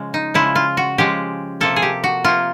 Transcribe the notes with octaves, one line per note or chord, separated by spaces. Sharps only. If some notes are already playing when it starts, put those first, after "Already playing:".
Already playing: C#3 F3 G#3
D#4
C#3 F3 G#3 E4
F4
F#4
C#3 F3 G#3 G4
C3 F3 A#3 A4
G#4
G4
F#4
C3 F3 A#3 F4